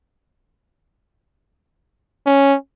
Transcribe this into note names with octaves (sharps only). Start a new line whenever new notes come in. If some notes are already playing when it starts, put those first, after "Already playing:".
C#4